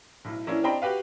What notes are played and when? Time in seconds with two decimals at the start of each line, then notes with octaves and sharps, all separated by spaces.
0.25 B1 A2
0.47 E3 A#3 C#4 D4 E4
0.64 C4 D4 D#5 G5 A#5 B5
0.82 F#4 G4 B4 F5